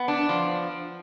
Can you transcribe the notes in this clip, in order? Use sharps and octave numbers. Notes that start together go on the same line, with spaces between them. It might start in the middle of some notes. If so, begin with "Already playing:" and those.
Already playing: B3
D4
F3